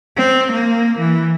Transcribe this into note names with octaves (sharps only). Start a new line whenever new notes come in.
C4
A#3
E3